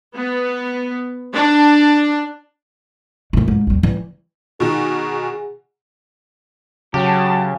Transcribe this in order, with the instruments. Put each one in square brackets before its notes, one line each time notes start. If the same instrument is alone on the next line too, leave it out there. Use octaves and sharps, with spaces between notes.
[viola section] B3
D4
[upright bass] A2 E3
G#2
D#2 G3
E3 G3
[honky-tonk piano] B2 D#3 [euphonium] G#4
[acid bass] C#3 [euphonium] F#3 [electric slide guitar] G4 [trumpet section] F#5 G5 A5